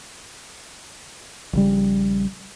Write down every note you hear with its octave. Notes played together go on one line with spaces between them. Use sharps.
A#1 C#3 G3